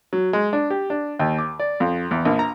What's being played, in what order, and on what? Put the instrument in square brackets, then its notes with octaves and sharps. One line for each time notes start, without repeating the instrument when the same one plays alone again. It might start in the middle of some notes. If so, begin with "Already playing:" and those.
[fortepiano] F#3
G#3
D4
G4
D4
D#2
D6
D5
F2
E2
A#1
A#5